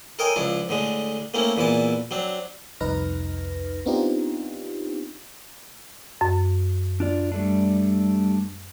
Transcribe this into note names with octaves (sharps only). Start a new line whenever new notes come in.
A4 A#4 C#5 D#5 G5 G#5
C#2 F3 D4 E4
A2 D3 G#3
A3 A#3 C4 C#4 E4
E2 A#2 E3 E4 A5
F#3 C4 D4
C2 F2 D#4 B4 F6 A#6
B3 C4 D4 D#4 F4 G4
F#2
D4 F4 D5
G3 A3 D4